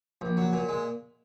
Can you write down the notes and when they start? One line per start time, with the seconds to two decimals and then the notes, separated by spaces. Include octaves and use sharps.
0.21 A#1
0.37 F#3
0.53 A#2
0.69 G#3